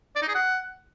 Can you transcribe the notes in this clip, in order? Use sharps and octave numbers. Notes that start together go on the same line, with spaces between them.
D5
D#4
G#4
F#5